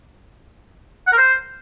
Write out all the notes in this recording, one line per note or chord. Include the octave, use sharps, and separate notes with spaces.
F#5
A#4
C5